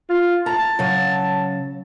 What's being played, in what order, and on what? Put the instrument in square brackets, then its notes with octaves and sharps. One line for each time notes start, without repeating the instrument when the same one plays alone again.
[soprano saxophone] F4
[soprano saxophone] A5 [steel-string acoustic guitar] A#5
[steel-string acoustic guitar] C#3 F#3